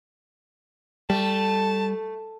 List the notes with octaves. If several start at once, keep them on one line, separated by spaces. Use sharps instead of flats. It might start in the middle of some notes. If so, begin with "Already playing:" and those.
G3 A3 A5